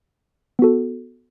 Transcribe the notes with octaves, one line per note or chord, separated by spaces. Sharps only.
B3 F#4 A4